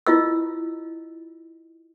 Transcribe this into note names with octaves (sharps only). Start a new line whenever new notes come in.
E4 F4 D#5 E6